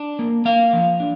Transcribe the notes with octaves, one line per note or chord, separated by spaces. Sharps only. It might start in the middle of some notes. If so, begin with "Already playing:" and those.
Already playing: D4
A#3
A#3 F5
F3
D4